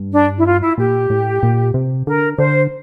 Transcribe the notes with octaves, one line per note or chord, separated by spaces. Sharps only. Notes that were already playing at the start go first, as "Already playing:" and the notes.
Already playing: G2
D4
E4
F4
E4
A#2 G4
A2
A#2
C3
D3 A#4
D3 C5